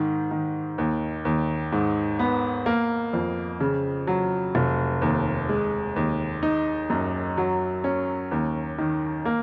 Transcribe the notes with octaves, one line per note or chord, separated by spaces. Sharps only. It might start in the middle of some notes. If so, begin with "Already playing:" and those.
Already playing: G#2 D#3
D#3
D#2
D#2
G#2
B3
A#3
F2
C#3
F#3
F1
D#2
G#3
D#2
D#4
F#2
F#3
C#4
D#2
D#3
A#3